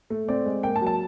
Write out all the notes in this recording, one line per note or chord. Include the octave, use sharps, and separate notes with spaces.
A3
C4 D5
G#3
A#3 G5
A5
F#3
A5